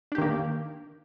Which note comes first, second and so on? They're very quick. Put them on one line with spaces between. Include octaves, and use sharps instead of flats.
D4 G4 D#3 A#3